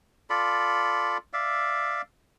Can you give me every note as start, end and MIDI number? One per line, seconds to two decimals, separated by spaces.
0.30 1.18 65
0.30 1.18 69
0.30 1.18 74
0.30 1.18 83
1.33 2.02 74
1.33 2.02 76
1.33 2.02 77